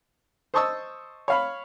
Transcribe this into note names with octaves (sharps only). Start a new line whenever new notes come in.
C5 D#5 A5 C#6 D#6 E6
C#5 F5 B5